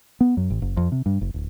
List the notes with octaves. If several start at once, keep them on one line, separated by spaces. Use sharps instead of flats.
B3
F#2
A1
F#1
F2
C3
G2
F#1
D1